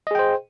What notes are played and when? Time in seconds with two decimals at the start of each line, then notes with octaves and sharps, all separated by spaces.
0.07 D#5
0.11 G#4
0.15 G5
0.19 C5